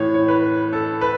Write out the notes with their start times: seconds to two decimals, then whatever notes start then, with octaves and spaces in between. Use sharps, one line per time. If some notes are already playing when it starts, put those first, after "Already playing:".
Already playing: A2 E3 C#5
0.14 C#5
0.28 B4
0.73 A4
1.01 B4